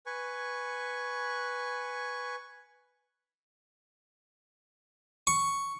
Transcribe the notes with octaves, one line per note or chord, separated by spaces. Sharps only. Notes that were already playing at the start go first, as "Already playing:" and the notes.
B4 G#5 C#6
C#6